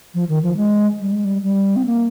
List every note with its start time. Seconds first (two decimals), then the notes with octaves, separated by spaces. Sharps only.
0.14 F3
0.29 D#3
0.43 F3
0.57 G#3
1.00 G3
1.12 G#3
1.25 G3
1.43 G3
1.76 C4
1.86 A#3